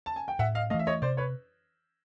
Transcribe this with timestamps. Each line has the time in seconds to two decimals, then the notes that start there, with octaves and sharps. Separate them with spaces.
0.06 A5
0.16 G#5
0.28 G5
0.39 A2 E5 F#5
0.55 D#5 F5
0.70 A3 D#5 F5
0.74 E3
0.79 E5
0.87 C#5 D#5
1.02 C3 C5 D5
1.17 B4 C#5